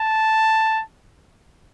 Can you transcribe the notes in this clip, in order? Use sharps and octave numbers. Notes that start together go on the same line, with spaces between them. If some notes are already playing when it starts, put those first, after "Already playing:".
Already playing: A5